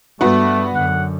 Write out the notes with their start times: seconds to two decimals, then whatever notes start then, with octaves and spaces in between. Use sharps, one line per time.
0.21 G2 G3 A3 B3 F#4
0.75 F#2 D3 F#5